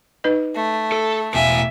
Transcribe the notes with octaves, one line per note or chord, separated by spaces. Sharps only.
D#4 B4 D#5
A3
A4
E1 A2 E5 F5 G#5